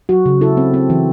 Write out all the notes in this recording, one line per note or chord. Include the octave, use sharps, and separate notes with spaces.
F#3 F#4
C#3
E4 A4
C4
C4
E3